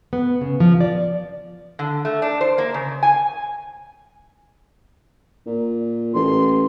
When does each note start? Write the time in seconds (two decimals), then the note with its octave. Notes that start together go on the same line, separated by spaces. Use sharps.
0.13 B3
0.41 C#3
0.60 F3
0.81 D5
1.79 D3
2.05 A3
2.22 D4
2.41 C5
2.58 A#3
2.74 C#3
3.03 G#5
5.46 A#2
6.14 A1 C6